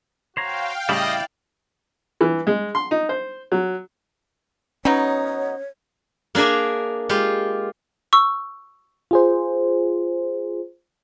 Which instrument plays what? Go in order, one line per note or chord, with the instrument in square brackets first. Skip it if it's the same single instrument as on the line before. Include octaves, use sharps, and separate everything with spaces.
[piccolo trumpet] F#4 [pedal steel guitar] C5 C#5 A#5 [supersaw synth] F5 G5
[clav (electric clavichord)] A2 C#3 G3 [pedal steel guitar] E4 D5 [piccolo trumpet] D#5
[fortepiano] E3
G#3
C6
D#4
C5
F#3
[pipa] F#3 B3 D#4 [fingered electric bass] C#4 [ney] C#5
[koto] A#3 D4 G#4 A#4 E5
G#3 F4 G4
[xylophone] C#6 E6
[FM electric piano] F4 G#4 C5